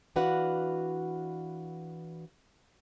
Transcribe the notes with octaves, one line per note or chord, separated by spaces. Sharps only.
E3 D4 F#4 B4 F5 F#5